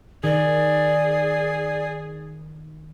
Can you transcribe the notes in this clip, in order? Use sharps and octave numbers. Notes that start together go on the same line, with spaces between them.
D#3 G#4 D5